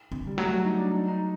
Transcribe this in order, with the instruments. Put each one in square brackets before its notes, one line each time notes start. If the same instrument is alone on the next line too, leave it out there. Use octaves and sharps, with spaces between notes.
[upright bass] D3
[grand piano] G3
[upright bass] F#3 [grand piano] A3
[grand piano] D#4
D4
D#4
D#4